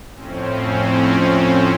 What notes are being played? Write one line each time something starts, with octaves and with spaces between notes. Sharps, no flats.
F2 A2 C4 C#4